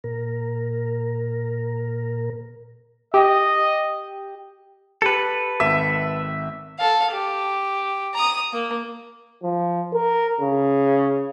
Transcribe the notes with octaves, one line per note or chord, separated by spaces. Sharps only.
A#2 A#4
G4 D#5
G4 A4 B4
G#1 E5
A4 F5
G4
A#5 D#6
A#3
F3
A#4
C#3